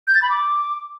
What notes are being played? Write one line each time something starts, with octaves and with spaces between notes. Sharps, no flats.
G6
A6
B5
D6